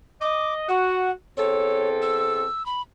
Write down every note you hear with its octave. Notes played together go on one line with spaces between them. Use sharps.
D#5 D6
F#4 F#5
E2 C4 A4 C#5
E6
B5